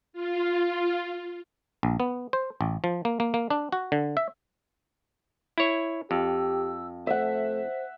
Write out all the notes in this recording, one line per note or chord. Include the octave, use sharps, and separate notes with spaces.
F4
A#1
B3
C5
A1
F3
A#3
A#3
A#3
D4
F#4
D3
E5
E4 C#5
F2 G4 E6
A3 C5 E5 F#5